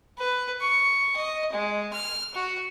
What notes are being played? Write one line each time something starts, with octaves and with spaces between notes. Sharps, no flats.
B4
C#6
D#5
G#3
F6
F#4